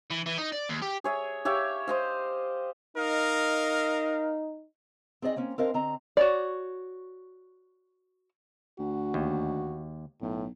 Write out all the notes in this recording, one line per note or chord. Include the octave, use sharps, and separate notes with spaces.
E3
E3
D#4
D5
D#2
G4
G#4 C#5 E5
G4 C#5 E5 F5
C5 D#5 F5
D#4 A#4 D#5 F5
C4 G#4 D5 D#5 G#5
A#3 C4 C#4
C4 D4 A#4 C5 D#5 F5
D3 C4 D#5 A#5
F#4 C#5 D5
D2 F#4
D#2
B1 A2